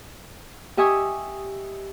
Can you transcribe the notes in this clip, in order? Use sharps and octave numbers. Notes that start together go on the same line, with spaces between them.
G4 D#5 E5 G#5 C#6 D#6